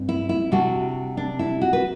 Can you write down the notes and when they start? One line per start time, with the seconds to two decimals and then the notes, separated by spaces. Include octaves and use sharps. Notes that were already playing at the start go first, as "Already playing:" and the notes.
Already playing: G2 C4
0.09 E4
0.29 E4
0.52 C3 G3 D4 F#4
1.17 D4
1.39 E4
1.61 F#4
1.73 B4